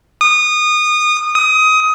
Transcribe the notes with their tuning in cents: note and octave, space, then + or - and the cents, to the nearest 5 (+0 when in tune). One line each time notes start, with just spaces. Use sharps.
D#6 -25
D#6 +20